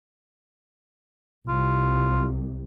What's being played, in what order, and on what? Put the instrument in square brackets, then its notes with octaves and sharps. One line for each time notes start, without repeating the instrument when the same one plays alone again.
[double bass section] C2 [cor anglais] F4